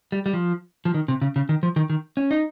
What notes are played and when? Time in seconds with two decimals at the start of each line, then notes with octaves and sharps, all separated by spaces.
0.12 G3
0.26 G3
0.33 F3
0.85 F3
0.94 D#3
1.08 C3
1.22 C#3
1.36 C#3
1.49 D#3
1.63 F3
1.76 D#3
1.90 D#3
2.17 C#4
2.31 D#4